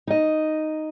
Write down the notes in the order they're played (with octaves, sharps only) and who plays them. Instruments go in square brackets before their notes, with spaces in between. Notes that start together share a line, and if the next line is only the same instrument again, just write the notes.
[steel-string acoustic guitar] D#4 D#5